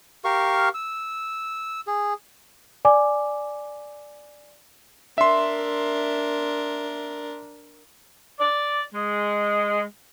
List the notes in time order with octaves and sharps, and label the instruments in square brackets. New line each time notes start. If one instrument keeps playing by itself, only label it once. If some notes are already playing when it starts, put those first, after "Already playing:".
[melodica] G4 A#4 F5 C#6
E6
G#4
[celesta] D5 G#5 D6
[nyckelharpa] D4 A#4 [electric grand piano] E5 C6
[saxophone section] D5
G#3